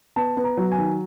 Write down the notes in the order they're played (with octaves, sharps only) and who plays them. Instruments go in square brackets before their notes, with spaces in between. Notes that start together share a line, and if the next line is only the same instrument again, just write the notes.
[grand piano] B3 A5
B3
A#5
F#3
G#5
D#3